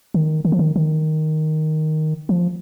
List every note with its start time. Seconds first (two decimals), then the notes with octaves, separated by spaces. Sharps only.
0.14 D#3
0.45 D#3
0.52 F3
0.59 D#3
0.76 D#3
2.29 F3